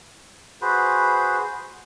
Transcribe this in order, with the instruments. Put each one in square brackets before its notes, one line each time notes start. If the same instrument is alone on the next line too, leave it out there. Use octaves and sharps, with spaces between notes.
[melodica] F#4 G#4 B4 C5